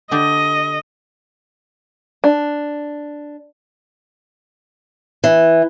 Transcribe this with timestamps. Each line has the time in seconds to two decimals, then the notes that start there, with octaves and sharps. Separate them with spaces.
0.11 D3 D4 G4 D#5
2.24 D4
5.24 E3